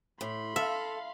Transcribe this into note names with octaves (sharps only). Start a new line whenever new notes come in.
A2 B5 C6
A4 E5 F5